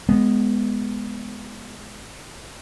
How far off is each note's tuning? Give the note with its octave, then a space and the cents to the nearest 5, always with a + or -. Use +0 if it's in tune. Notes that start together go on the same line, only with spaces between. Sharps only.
G#3 +0 B3 +0